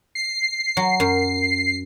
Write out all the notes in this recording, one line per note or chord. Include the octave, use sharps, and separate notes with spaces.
C7
F#3
F#2